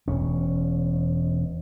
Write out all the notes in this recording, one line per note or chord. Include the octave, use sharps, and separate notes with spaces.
E1 C#4